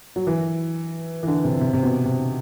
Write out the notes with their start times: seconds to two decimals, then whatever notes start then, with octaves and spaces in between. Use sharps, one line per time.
0.16 F#3
0.27 E3
1.23 E3
1.27 D3
1.44 C3
1.61 C3
1.73 C3
1.83 B2
2.05 C3